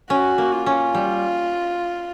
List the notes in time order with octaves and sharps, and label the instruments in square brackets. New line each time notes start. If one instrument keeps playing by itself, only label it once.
[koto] C#4 [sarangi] F#4
[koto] A#3
[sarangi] F4
[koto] C#4
G3